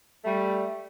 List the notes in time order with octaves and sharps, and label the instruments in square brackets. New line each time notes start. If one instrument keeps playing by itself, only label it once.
[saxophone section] G3 A3